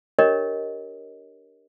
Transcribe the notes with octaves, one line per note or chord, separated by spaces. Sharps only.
D4 G4 A#4 C#5 D#5